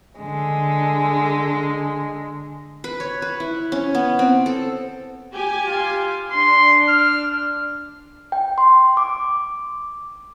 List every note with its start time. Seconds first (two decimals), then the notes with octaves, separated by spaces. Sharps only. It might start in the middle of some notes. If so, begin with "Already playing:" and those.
0.19 D3 G#3
2.84 B4
3.00 C#5
3.22 B4
3.40 E4
3.72 C#4
3.95 B3
4.19 C4
4.46 A4
5.34 G4 G#5
5.67 F4
6.32 D4 C6
6.89 F6
8.32 G5
8.58 C6
8.97 D6